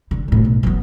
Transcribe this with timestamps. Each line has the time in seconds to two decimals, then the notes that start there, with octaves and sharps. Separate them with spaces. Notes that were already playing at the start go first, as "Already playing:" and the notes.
0.11 D3
0.28 A2 F#3
0.44 B1
0.63 F#3 B3